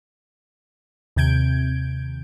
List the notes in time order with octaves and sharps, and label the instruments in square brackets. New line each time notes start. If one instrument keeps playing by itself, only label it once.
[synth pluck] D#2 C3 G6 G#6 D7